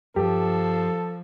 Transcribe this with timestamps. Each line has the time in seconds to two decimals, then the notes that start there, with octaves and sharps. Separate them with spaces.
0.16 G2 F3 G4 A4